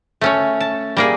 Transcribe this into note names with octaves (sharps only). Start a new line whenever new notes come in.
A3 C#4 C#5
A5
G3 A#3 G#4